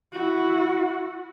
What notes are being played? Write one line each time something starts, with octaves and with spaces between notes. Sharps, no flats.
E4 F#4